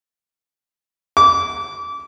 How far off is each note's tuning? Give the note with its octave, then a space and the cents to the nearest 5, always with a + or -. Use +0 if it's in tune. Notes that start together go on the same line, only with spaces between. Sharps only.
D6 -25